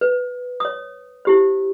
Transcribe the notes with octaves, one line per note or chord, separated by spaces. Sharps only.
B4
C#5 D#6
E4 G4 C5